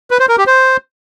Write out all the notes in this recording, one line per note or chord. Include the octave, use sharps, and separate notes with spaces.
B4
C5
A#4
G4
C5